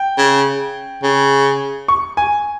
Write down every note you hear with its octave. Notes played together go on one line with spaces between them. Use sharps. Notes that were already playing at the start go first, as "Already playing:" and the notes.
Already playing: G5
C#3
C#3
C#6
G#5